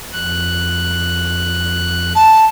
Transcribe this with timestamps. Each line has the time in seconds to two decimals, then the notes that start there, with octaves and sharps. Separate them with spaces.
0.13 F2 F#6
2.15 A5